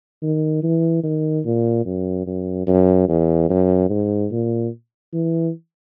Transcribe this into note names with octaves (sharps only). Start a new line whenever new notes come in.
D#3
E3
D#3
A#2
F#2
F#2
F#2
E2
F#2
G#2
A#2
E3